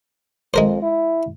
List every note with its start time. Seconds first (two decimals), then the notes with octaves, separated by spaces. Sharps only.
0.54 F2 G#3 A#4 C5
0.82 E4